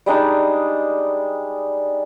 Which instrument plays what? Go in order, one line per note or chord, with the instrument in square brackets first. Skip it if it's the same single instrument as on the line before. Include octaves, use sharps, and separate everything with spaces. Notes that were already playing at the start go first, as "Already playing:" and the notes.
[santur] G3 G#3 D4 D#4